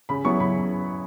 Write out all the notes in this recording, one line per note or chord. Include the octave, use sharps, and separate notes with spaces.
C#3 B5
F#3 B3 E4 C#6
C#3 B5